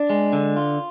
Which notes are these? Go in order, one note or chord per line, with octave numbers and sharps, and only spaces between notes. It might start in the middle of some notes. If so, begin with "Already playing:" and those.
Already playing: D4
G#3
D3
F4